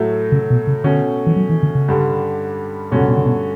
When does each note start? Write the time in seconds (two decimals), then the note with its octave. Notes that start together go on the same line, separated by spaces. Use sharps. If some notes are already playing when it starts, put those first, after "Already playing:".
Already playing: A2 F#3 A3
0.32 C#3
0.50 B2
0.67 C#3
0.84 B2 D3 A3 C#4
1.27 E3
1.36 F#3
1.49 E3
1.63 D3
1.75 C#3
1.88 G2 D3 G3
2.91 G2 B2 D3 A3 C#4 F#4
3.01 C#3
3.08 B2
3.17 C#3
3.25 B2